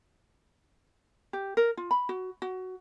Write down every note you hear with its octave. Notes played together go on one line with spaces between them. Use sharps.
G4
A#4
F4
B5
F#4
F#4